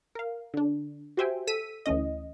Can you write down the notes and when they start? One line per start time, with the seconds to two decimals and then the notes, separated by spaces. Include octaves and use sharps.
0.15 A#4 F5
0.54 D3 D4
1.17 F#4 G4 C5 E5 G5 G#5
1.47 A4 E6 B6 D#7
1.86 D2 E3 A3 C#4 D#5